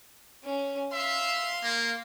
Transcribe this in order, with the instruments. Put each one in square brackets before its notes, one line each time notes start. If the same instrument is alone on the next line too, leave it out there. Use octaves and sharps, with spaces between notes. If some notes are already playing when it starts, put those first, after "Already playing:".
[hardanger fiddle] C#4
[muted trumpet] E5 [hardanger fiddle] F5 C6
[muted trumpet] A#3